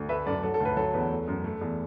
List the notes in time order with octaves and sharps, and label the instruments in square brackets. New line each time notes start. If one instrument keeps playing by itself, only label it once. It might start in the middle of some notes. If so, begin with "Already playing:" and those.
Already playing: [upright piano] D2
A3 B4 E5
F#2 A4 D5
F#3 A4
A4
D2 B4
F#3 A4
E2 B4
A3
F#2
A3
E2